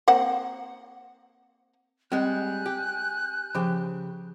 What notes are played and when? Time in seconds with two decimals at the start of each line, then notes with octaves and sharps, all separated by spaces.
0.08 A#3 C4 F#5
2.12 G3 G#3 C4 G#5 F#6 G6
2.66 G4
3.55 C#3 F3 G4